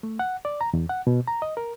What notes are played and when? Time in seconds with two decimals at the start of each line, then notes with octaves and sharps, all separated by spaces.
0.03 A3
0.19 F#5
0.45 D5
0.61 A#5
0.73 E2
0.89 F#5
1.07 B2
1.27 A#5
1.42 D#5
1.57 A#4